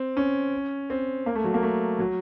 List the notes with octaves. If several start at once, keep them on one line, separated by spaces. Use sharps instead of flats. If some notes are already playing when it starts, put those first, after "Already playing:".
Already playing: C4
C#4
C4
A#3
A3
F#3
A#3
A3
F#3